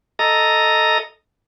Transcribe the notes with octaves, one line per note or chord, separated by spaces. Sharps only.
A4 D#5 A#5